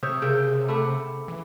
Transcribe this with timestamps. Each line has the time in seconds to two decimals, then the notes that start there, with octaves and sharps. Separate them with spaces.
0.03 C3 C#5 E5 D#6 E6 G6
0.22 C#3 G#4 A#4 E5 G5 E6
0.68 A3 E5 F#5 B5 D6
1.28 E3